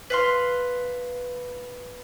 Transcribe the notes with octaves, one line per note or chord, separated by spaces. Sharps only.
B4 F5 C6